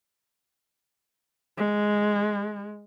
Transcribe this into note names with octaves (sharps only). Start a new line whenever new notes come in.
G#3